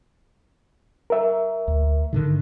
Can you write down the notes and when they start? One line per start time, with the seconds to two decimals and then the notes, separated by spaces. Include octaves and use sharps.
1.10 A#4 E5
1.68 D2
2.13 G#2 D3 D#3